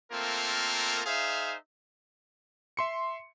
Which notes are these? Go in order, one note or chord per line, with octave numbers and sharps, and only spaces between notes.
A3 A#3 C4 F4 A#4
D#4 G#4 C5 E5 F5
E5 C6 C#7